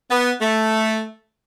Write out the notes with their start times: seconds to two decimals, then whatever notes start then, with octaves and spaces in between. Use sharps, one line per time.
0.11 B3
0.41 A3